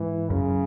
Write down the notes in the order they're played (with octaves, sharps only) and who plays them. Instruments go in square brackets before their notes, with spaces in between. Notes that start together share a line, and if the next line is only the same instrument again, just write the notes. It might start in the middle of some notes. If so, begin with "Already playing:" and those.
Already playing: [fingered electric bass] G#2 [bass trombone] E3
[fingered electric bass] F#2 [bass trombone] C#3